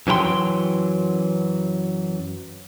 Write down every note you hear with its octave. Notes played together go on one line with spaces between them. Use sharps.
F#2 E3 F#3 A#4 G5 C6